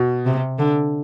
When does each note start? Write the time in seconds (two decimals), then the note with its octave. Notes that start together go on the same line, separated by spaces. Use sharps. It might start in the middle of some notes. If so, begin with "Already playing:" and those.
Already playing: B2
0.25 C3
0.59 D3